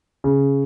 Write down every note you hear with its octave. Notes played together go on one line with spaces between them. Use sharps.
C#3